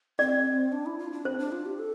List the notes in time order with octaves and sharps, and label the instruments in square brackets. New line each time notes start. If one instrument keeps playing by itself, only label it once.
[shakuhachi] C4 [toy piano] D5
[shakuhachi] D4
E4
F4
D4
[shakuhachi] C4 [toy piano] C5
[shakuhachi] D4
F4
G4
A4